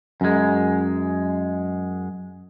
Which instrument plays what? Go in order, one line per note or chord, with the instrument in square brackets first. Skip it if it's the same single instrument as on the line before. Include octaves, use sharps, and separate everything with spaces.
[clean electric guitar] F#2 G#3